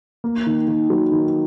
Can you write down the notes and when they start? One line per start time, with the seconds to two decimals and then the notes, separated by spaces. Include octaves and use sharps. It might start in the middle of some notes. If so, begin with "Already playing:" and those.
0.24 A#3
0.46 D#3
0.68 D#3
0.90 F#3
1.12 D#3